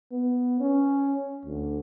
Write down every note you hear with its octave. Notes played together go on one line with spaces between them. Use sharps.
B3
C#4
D2